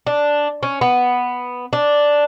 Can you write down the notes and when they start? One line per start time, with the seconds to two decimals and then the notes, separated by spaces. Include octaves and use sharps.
0.07 D4
0.63 C#4
0.81 B3
1.73 D4